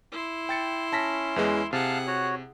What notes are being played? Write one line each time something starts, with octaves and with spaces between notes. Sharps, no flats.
E4 C6
G5 A6 C#7
C#4 A5 A#6 B6
E2 E3 G#3
C3 G#4 F5 F#5 A5 F6
F#4 C#5